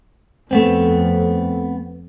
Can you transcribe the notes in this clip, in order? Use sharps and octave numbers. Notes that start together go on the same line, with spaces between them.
F2 A3 B3 C4